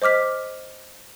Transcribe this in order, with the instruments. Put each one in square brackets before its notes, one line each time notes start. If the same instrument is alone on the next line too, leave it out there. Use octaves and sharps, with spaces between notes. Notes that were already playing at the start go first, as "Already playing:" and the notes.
[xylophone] C5 D#5 D6 F6 B6